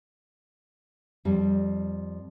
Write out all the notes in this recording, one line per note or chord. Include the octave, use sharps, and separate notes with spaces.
F2 G3